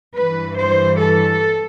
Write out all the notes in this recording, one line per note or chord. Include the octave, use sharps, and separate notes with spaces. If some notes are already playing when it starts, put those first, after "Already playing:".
G2 E3 B4
C5
A4